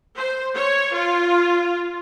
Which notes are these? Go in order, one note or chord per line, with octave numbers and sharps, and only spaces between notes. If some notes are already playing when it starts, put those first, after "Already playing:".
C5
C#5
F4